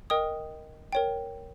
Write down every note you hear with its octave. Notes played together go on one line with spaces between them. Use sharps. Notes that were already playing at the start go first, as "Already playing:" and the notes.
A#4 D#5 G5 D#6
A#4 C#5 G5